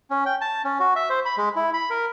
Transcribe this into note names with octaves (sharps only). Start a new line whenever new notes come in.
C#4
G5
A5
C#4
F#4
E5
C5
B5
G#3
E4
B5
A#4